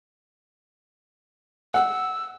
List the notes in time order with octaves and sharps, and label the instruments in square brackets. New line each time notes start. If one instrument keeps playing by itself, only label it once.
[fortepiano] F#5 [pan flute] E6